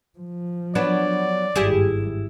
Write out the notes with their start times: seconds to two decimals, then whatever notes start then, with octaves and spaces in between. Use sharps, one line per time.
0.19 F3
0.75 F#3 B3 D4 D5
1.56 G#1 G2 E4 G4 G#4